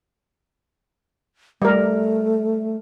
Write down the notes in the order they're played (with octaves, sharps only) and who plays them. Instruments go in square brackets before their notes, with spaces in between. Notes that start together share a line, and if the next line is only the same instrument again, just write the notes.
[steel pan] G3 A#4 [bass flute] A3